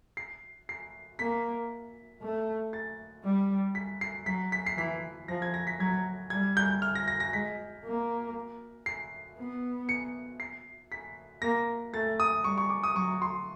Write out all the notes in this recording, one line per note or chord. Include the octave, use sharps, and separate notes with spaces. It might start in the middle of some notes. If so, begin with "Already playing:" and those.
C7
C7
A#3 B6
A3
A6
G3
B6
C7
F#3 B6
B6
C7
E3 B6
F3 A#6
G#6
A#6
B6
F#3 G#6
G3 G#6
G6
F6
A#6
A#6
A#6
G#3 B6
A#3
C7
B3
C#7
C7
B6
A#3 A#6
A3 A6
D#6
G3 C#6
C#6
D6
D#6
F#3 C#6
C6